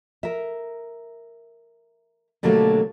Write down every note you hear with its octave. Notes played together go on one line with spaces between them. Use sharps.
A#4 E5
B2 D3 F#3 G3 A3 A#3